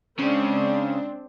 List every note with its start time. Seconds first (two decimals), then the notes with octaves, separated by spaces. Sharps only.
0.19 C#3 G#3 C4 D4